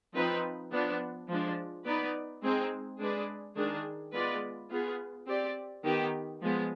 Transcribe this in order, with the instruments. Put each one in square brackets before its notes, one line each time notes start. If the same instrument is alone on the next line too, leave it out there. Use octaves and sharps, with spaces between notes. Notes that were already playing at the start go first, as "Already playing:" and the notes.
[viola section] F3 C4 D#4 B4
F3 B3 D4
F3 G#3 D4
B3 D#4 B4 D5
G#3 C4 D#4 G#4
G#3 D4 G#4 B4 D5
D#3 G#3 D4 G#4
G#3 B3 F4 B4 D5
B3 F4 G#4
C4 G4 D5
D#3 B3 D#4 G4
F3 G#3 B3